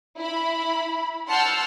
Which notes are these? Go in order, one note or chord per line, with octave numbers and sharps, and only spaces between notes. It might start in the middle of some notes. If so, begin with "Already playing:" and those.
E4 B5
F#5 A5 C6 E6 F6 G6